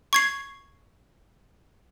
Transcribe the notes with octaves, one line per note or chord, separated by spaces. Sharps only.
C#6 G#6 C7